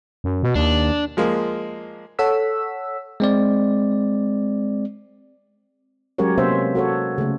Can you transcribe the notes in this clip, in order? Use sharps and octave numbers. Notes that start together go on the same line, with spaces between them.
F#2
B2
D#2 D4
F3 G#3 A#3
A4 C#5 F#5 E6 B6
G#3 C4 D5
F#3 G#3 C#4 G4 A#4 C#5
C3 A#3 B3 C#4 C5 E5
F#4 A4 C#5
C#3 A3